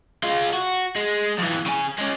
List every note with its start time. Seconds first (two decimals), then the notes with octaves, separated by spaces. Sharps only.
0.24 G#3 F4
0.53 F#4
0.96 G#3
1.38 F2 E3
1.66 C#3 G#5
1.98 G#3 C#4